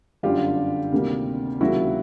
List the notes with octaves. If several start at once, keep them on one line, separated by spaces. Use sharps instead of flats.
G1 F#2 D3 G3 F4 G4
D2 C3 D#3 G3 A#3
C#2 C3 D#3 F#3 A#3 E4 F#4